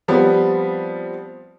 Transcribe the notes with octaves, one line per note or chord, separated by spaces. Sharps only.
F3 G3 B3 C4